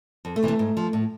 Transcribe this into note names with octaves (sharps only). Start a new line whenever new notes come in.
F2
A3
C3 E3
A3
G#2
F3
A2